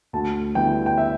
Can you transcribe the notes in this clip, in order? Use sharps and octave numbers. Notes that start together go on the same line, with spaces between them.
D2 A5
D3 G3 B3 E4 G5
G5
E5